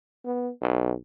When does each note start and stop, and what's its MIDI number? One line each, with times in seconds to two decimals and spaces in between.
0.25 0.50 59
0.62 0.93 35